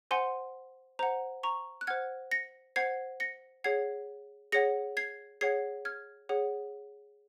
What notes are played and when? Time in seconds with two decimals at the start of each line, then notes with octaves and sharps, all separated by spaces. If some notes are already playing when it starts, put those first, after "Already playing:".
0.11 C5 F#5 G#5 C6
0.99 C5 F#5 A#5
1.43 A#5 C#6
1.81 F#6
1.87 C5 F#5 F6 G#6
2.31 A#6 C#7
2.76 C5 F#5 G#6 C7
3.20 A#6 C#7
3.64 G#4 C#5 F#5 G#6 C7
4.52 G#4 C#5 F#5 A#6 C#7
4.97 G#6 C7
5.41 G#4 C#5 F#5 G#6 C7
5.85 F6 G#6
6.29 G#4 C#5 F#5